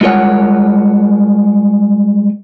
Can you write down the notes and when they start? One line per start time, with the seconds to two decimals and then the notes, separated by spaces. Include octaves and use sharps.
0.01 G3 G#3 F4 A#4 C#5 F#5